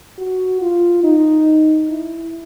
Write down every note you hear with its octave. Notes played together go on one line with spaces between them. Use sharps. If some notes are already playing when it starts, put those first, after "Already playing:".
F#4
F4
D#4
E4